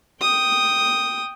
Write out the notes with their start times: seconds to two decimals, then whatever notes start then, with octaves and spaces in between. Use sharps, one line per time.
0.22 G5 D#6